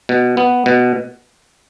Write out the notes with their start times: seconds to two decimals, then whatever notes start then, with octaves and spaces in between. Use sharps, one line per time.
0.09 B2
0.37 B3
0.66 B2